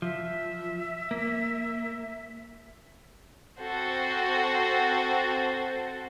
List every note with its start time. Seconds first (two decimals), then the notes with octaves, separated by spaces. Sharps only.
0.02 F3 E5
1.11 A#3
3.60 C4 F#4 A4 C5